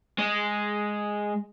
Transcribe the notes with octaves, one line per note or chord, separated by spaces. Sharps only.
G#3